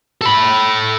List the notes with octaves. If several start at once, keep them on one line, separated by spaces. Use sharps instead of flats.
A4 B5